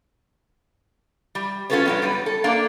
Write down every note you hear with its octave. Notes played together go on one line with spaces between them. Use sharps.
G3
C#4 F4 F#4 A4 B4 C#5
G2 F#3 B3
G3 B4
A4
A#3 D4 A4 F5